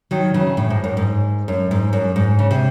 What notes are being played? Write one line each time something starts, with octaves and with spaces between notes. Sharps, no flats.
D#3 F#3
C#3 E3
A2
G#2
F#2
G#2
F#2
G#2
F#2
G#2
C#3
C3